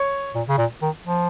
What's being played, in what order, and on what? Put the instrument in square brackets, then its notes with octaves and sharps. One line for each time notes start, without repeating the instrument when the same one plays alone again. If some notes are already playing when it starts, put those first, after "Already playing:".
Already playing: [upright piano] C#5
[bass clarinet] A#2
C#3
A#2
D#3
F3